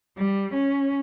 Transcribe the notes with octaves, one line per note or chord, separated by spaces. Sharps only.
G3
C#4